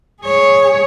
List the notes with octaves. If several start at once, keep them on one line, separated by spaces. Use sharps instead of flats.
G#4 C#5